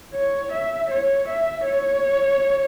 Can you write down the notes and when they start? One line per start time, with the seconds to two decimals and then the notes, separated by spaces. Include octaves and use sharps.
0.14 C#5
0.52 E5
0.91 C#5
1.28 E5
1.66 C#5